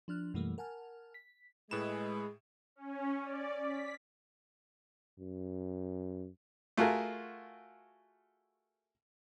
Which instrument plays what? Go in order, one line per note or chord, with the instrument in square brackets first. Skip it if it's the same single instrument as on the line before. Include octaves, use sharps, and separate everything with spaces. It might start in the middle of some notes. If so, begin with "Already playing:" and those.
[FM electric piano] F3 D4 F6 F#6
F#2 B2 E3 G3 A3 A#3
A#4 F#5 G#5 A5 F6
B6
[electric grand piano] A2 E7 [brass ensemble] G#3 [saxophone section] E4 B4 [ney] G#4
[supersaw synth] C#4
D5
B6
[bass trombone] F#2
[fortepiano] A3 F4 F#4 G#4 A#4